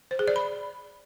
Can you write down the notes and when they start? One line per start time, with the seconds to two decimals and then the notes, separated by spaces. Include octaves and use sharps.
0.11 C5
0.19 G#4
0.28 D5
0.36 B5